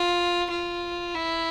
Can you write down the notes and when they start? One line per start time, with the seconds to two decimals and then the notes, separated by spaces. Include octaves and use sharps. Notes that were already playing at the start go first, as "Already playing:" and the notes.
Already playing: F4
0.50 F4
1.15 E4